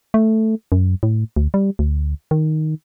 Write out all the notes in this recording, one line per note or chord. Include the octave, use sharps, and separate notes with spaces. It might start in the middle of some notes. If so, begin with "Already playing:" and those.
A3
F#2
A2
D2
G3
D2
D#3